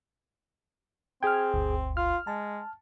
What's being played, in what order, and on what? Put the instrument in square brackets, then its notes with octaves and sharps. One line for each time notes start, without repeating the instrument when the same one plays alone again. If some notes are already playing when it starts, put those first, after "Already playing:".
[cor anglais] C4 [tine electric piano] G#4 G5 [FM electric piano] F6 G#6
[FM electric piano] G1 D2
[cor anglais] F4 [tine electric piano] F6
[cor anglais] G#3 [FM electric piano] A5